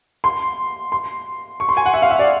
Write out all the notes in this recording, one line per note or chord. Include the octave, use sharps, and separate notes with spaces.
C6
C6
C#6
C6
G#5
F#5
E5
F5
E5
D5